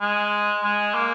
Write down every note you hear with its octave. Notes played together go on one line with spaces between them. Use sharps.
G#3
G#3
A#3